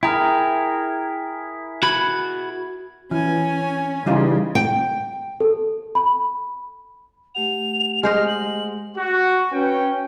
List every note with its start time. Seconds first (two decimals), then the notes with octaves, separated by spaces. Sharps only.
0.03 E4 G#4 A#4 G5 A#5
1.83 F#4 B5 G#6
3.11 E3 C#4 C#5 G#5
4.06 C#3 E3 G3 D#4 F4
4.55 G5
5.40 A4
5.95 B5
7.35 A3 G4 F#5 F7
8.03 G#3 C5 D#5 F6
8.27 F#7
8.98 F#4
9.52 C#4 B4 G5